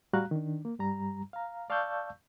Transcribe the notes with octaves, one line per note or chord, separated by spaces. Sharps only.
A2 G3 F#4 F5 A#5 F#6
D#3 D4
A#3
G2 G3 A#5
F5 A#5
D5 F5 A5 C#6 E6 G6